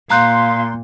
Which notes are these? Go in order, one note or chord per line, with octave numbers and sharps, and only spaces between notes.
A#2 F5 A#5 C6 F#6 G6